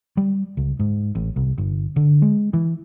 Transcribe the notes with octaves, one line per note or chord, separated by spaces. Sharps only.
G3
C#2
G#2
A1
C2
G1
D3
G#3
E3